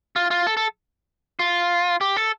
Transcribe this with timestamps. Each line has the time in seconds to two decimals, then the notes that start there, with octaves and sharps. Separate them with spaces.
0.16 F4
0.31 F4
0.47 A4
0.57 A4
1.39 F4
2.01 G4
2.16 A4